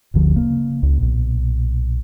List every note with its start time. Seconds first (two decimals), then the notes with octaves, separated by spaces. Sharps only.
0.14 F#1 D2 D3 F3
0.36 C#3 A#3
0.83 C#2
0.99 B1 A#2